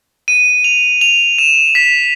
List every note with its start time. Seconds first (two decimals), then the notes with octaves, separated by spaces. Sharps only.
0.28 D#7
0.64 F7
1.01 F7
1.39 E7
1.75 B6